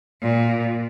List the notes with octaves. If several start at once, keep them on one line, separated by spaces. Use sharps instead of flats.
A#2